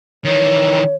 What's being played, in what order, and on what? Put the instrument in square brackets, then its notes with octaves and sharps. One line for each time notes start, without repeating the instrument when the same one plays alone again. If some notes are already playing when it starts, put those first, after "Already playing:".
[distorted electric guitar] D#3 E3 [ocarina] C#5